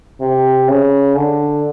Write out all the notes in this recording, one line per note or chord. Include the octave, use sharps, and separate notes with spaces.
C3
C#3
D3